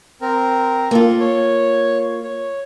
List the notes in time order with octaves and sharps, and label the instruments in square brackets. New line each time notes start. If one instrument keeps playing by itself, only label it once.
[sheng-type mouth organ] C4 A#4
[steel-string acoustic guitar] A#3 F4 [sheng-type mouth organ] A4
[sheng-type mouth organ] C#5
C#5